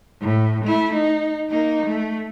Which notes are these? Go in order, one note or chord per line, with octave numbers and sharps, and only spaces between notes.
A2
A3 E4
D#4
A#3 D#4
A3